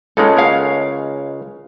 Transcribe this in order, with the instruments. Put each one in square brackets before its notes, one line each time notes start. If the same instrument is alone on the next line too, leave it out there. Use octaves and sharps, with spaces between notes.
[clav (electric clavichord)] C#2 C#3 G#3 [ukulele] D#4 A4
[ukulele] A#4 C#5 F5